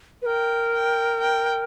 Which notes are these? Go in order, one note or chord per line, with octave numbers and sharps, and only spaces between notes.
B4
A#4 G5
G5
G5